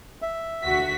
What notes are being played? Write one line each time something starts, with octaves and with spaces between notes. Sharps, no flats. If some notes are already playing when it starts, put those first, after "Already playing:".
E5
D2 F#4 B6